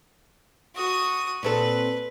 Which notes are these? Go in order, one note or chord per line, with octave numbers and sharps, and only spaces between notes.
F#4 D#6
A#2 C4 A4 B4